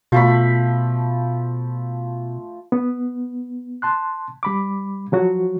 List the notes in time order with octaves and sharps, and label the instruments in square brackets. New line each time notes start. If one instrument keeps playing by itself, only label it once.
[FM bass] B2 [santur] F3 A3 B5
[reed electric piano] B3
A5 C6 F#6
G3 B5 D6
F3 F#3 F#4